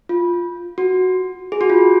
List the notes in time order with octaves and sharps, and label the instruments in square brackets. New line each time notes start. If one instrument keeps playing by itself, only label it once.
[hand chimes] F4
F#4
G#4
F#4
F4